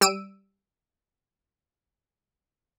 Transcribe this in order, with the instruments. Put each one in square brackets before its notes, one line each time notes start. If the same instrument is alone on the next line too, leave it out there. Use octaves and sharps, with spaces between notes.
[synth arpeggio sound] G3 E6 D7 D#7